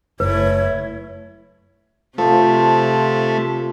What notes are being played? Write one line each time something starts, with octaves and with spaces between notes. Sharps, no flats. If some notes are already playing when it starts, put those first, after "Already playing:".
F#1 A3 E4 B4 C#5
C3 F3 A3 C5